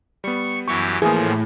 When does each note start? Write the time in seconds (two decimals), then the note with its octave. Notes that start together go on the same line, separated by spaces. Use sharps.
0.24 G3 B3 C#6
0.68 F#2 E3 G4 C#6
1.02 A2 E3 F3 A#3 G#4